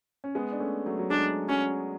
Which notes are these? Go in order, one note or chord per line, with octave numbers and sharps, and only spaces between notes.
C#4
G#3 B3
D4
A3 C#4
F#3 A3
F#3
G#3 D4
F#3 C#4